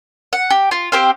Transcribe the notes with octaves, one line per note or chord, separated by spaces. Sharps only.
F#5
G4
F4
C4 G4 C5 F5